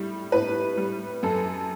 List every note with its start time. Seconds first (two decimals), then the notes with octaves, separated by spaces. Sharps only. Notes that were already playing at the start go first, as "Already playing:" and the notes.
Already playing: A2 G3
0.32 A2 B4
0.77 G3
1.23 F#2 A4